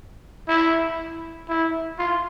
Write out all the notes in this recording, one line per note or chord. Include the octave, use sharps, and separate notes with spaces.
E4
E4
F4